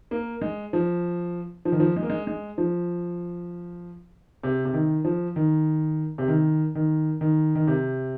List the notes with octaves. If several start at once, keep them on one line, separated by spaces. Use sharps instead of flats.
A#3
G#3
F3
F3
D#3
F3
G#3
A#3
G#3
G#3
F3
C3
C3
D#3
F3
D#3
C3
D#3
D#3
D#3
D#3
C3